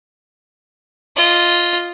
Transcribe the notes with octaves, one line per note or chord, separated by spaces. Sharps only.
F4 D#5